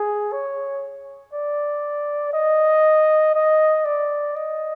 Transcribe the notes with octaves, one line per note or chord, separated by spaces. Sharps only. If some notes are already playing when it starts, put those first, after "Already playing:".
Already playing: G#4
C#5
D5
D#5
D#5
D5
D#5